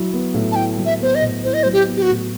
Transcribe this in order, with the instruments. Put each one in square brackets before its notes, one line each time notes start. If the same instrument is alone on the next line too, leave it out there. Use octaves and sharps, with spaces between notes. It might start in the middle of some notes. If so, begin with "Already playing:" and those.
Already playing: [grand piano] F#3 E4
B3
A2
[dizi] A5
[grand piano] E4 [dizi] G5
[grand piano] F#3
[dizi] E5
[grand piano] B3 [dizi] C5
[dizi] D#5
[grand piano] A2
[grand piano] E4 [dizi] C5
[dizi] D#5
[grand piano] F#3 [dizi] C5
[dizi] G4
[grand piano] B3
[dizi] G4
F#4
[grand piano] A2